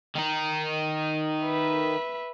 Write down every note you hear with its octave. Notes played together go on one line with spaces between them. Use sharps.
D#3 D#4
B4 E5